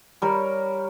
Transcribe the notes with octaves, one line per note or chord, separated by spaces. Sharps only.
G3 A#4 C#5